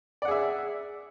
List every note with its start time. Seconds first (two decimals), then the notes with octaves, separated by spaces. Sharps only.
0.22 D5
0.25 F#5
0.28 G#4
0.31 E5